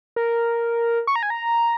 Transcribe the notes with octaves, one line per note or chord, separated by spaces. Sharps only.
A#4
C#6
A#5
G#5
A#5